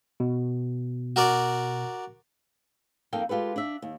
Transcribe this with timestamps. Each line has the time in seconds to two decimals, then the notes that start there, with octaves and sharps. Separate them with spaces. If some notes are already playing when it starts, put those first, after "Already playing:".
0.20 B2
1.16 F#4 A#4 D5
3.13 F2 A#3 D#4 A4 F5 G5
3.29 G#3 F4 G4 A4 B4
3.56 D4 E5
3.82 D#2